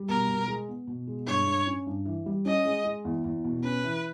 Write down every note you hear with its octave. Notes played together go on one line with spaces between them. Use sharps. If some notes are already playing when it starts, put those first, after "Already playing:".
Already playing: G3
B2 A#4
B2
G#3
B3
B2
G#3
G2 C#5
G2
C#4
G2
E3
G3
C#4 D#5
G#3
G#3
E2
E2
B2
C#4 B4
E3